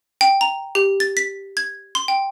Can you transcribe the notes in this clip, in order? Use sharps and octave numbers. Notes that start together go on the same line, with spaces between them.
G5
A#5
G4
A6
B6
G#6
C6
G5